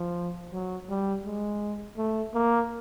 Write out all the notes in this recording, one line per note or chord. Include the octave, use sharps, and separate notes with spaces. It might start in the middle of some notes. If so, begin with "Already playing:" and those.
Already playing: F3
F#3
G3
G#3
A3
A#3